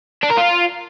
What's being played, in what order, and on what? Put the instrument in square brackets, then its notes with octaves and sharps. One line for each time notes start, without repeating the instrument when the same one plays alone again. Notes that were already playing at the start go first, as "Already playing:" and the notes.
[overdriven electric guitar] D4
A#4
F4